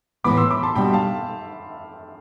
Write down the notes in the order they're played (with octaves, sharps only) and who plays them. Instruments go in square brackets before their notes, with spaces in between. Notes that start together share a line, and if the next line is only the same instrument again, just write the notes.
[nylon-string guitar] A2 E3 B3 [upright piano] B5 D6
[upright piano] C6 E6
B5 D6
A5 C6
[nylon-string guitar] B2 G3 D4 [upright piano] G5 B5
[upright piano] F5 A5